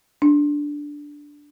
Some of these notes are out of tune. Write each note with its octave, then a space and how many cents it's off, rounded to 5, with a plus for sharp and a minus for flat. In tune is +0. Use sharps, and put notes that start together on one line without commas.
D4 -5